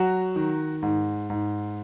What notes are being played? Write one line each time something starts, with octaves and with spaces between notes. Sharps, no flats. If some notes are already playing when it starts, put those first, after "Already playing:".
Already playing: F#3 F#4
D#3
G#2
G#2